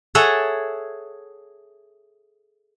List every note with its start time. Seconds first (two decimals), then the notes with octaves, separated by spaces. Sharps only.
0.15 G#4 A4 C#5 E5 F#5